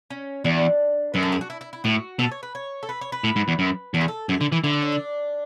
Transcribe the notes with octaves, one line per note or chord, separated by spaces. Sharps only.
C#4
E2 D4
F#2 B4
A4
G#4
F#4
E4
E4
E4
A2 F#4
B2 A4
C#5
B4
C#5
A4
B4
C#5
B4
A2
G#2
E2
F#2
E2 A4
G#4
A4
F#2 G#4
D3 E4
E3 E4
D3 E4
D4
C#4
D4